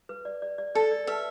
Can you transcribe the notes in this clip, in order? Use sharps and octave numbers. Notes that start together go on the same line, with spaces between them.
B4
D5
D5
D5
A4 D5
D5
B4 E5